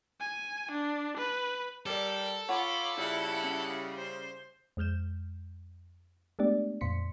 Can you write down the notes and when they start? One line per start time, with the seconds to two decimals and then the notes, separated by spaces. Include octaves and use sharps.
0.20 G#5
0.71 D4
1.17 B4
1.86 G3 A4 A#4 C#5 D5
2.49 F4 C#5 F#5 B5 D6
2.97 C#3 G3 E4 F4 E5 F#5
3.43 C#4
3.97 C5
4.77 F2 G#3 F6 G6 E7
6.39 G#3 A3 B3 D4 G4 D5
6.81 F2 A#2 C6 B6 C#7